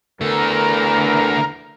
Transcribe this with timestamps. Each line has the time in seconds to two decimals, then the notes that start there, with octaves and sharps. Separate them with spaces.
0.21 E2 D3 A3 A#4